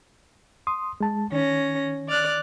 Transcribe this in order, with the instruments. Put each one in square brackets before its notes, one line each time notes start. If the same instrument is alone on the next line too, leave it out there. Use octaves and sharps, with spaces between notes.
[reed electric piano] C6 D#6
G#3 A5
[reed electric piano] D#3 [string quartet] C#4 A#6
[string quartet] D5 F6 F#6